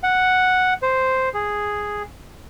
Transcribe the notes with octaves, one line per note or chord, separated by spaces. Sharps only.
F#5
C5
G#4